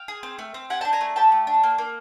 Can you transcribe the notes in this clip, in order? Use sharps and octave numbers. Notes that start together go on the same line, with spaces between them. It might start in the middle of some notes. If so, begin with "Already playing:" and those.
Already playing: F5 G5
G#4
C4
A3
C4
G4 F#5 G#5
D4 G5 A5
G#5 A#5
A3
G4 G5 A5
A3
D4
A#3
A#3